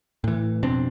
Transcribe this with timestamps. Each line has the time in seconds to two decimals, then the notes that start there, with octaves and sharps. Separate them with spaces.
0.24 A2 E3
0.63 F2 B2 C4 D4